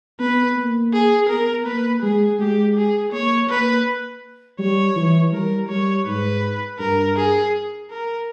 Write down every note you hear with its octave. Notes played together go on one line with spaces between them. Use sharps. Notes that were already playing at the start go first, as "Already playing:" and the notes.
B3 B4
A#3
G#4
B3 A#4
A#3 B4
G#3 G#4
G#3 G4
G#4
A#3 C#5
A#3 B4
G3 C#5
E3
G3 A#4
G3 C#5
G#2 B4
G2 A#4
G#4
A#4